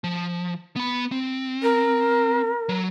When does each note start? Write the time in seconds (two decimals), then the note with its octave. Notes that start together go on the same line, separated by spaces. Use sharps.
0.04 F3
0.76 B3 B5
1.12 C4
1.63 A#4
2.69 F#3